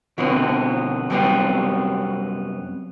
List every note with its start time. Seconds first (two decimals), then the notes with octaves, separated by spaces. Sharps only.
0.18 B2 D3 F3 B3 C4
1.10 F#2 C3 G3 A3 B3 C4